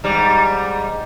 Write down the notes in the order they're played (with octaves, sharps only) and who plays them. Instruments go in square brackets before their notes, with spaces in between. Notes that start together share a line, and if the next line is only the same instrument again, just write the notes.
[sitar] G#2 G3